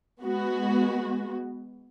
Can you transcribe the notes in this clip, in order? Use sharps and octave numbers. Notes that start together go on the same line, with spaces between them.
G#3 B3 F#4